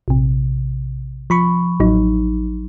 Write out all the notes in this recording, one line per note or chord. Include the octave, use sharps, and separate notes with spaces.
A#1 C3
F3 B5 C#6
A1 F#3 D#4